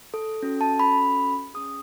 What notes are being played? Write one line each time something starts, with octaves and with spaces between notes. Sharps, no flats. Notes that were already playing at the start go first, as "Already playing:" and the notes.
A4
C#4 F#4 A4
A5
B5
C#4 G#4 D#6